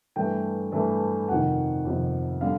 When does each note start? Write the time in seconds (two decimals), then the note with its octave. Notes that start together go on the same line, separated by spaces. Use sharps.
0.16 G2 E3 A3 G5
0.72 G2 E3 A3
1.29 F2 C3 D#3 F#5
1.85 F2 C3 D#3
2.41 D3 G3 F5